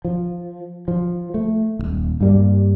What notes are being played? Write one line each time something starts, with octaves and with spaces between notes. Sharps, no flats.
F3
F3
A3
D#1 C2
G2 G3 A#3